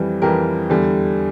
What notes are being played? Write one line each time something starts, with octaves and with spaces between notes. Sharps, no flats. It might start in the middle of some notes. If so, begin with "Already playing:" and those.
Already playing: F2 E3 G3
F2 E3 G3 G4 A#4
E2 D3 G3